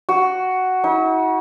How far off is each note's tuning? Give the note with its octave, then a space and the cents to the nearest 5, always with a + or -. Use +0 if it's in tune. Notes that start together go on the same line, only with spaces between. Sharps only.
F#4 +5
E4 -45